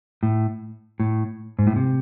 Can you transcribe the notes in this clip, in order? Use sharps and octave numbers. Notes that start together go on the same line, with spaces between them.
A2
A2
G#2
A2
C3